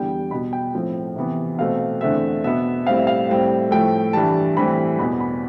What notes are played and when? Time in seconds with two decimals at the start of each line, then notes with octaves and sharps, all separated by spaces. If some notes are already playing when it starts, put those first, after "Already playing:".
Already playing: E2 D3 G3 B3 G5
0.31 B2 B3 B5
0.53 G5
0.74 A2 F3 C4
1.16 C3 E3 B3
1.58 B2 A3 C4 F5
2.01 E2 D3 A3 C4 E5
2.44 B2 B3 E5
2.86 A2 G3 C4 F5
2.97 E5
3.07 F5
3.29 A2 G3 C4
3.71 A2 F3 A3 G5
4.13 G2 E3 G3 A5
4.57 A2 E3 G3 C4 B5
4.98 E2 B2 B3 B5
5.20 B5